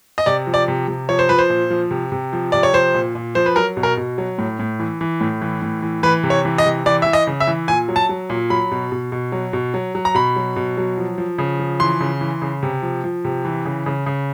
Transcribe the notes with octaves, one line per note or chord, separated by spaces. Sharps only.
D#5
C3 D5
F3
D5
C3
C3
F3 C#5
C5
F3 B4
C5
A#2
F3
C3
C3
F3
C3 D5
C#5
F3 C5
A#2
A#2
F3 C5
B4
F#3 A#4
B2
A#4
B2
F#3
A2
A2
E3
E3
A2
E3
A2
E3
E3 B4
C3
C#5
E3
D#5
C3
E3 D5
E3 E5
D#5
C#3
E5
E3
A#2 G#5
F#3
A5
F#3
A#2
F#3 B5
B2
B2
B2
F#3
B2
F#3
F#3
A#5
B2 B5
F#3
B2
F#3
F3
F3
C#3
F3
E3 C6
C#3
E3
C#3
C3
F3
F3
C3
E3
C#3
C#3
C#3